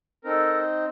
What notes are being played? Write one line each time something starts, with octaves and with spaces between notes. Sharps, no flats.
C4 D#4 A4 A#4